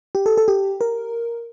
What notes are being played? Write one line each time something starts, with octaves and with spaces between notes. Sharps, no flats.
G4
A4
A4
G4
A#4